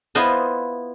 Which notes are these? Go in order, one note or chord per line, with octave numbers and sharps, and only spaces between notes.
B3 E4 F4 C5 D#5